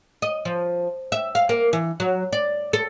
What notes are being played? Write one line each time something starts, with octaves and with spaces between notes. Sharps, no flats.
D#5
F3
E5
F5
A#3
E3
F#3
D5
A4